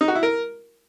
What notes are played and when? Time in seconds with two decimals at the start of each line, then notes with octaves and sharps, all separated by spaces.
0.01 D#4
0.08 F#4
0.15 E4
0.23 A#4